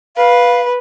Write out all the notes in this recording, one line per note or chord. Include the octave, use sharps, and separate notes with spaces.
B4 F5